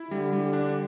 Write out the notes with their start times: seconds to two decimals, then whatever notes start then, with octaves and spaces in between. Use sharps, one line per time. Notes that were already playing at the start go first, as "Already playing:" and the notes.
Already playing: E4
0.11 D3 G3
0.33 G3
0.53 D4